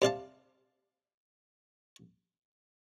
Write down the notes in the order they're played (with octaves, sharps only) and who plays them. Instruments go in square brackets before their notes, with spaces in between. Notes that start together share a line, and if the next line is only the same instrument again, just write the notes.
[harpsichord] C3 D5 F5 A5